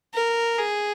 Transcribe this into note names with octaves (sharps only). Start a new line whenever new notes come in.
A#4
G#4